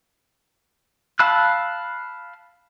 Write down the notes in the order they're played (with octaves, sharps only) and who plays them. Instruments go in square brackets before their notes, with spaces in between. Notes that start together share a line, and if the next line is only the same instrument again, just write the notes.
[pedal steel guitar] F5 A5 B5 E6 F#6